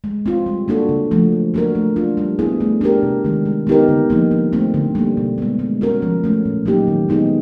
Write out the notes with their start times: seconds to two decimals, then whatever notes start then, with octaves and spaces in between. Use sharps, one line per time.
0.04 G#3
0.26 C4 F4
0.46 G3
0.68 A#3 D4 F#4 A4
0.89 C#3
1.11 F3 A3
1.32 F#3
1.54 A#3 D4 F#4 A#4
1.75 A3
1.96 D4 F4
2.17 G3
2.39 B3 E4 G#4
2.60 A3
2.81 D4 G4 A#4
3.03 C3
3.24 D#3 G#3
3.46 G#3
3.67 B3 D#4 G4 A#4
3.88 D3
4.10 F3 A#3 D#4
4.31 F3
4.52 A3 C4
4.74 D3
4.95 G3 A#3
5.17 B2
5.38 G#3 B3
5.59 G#3
5.81 C#4 F#4 A#4
6.02 F3
6.24 A3 C#4
6.45 A#2
6.66 F#3 A#3 D#4 G4
6.88 D#3
7.09 G#3 B3 D#4 G#4